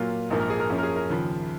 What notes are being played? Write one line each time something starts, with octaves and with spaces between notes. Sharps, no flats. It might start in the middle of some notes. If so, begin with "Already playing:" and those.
Already playing: A#2 F#3 A#3 F4
A#1 G#2 F3 A#3
A#4
G#4
A#4
F#2 F3 A#3 C#4
A#4
G#4
A#4
D#2 C#3 F3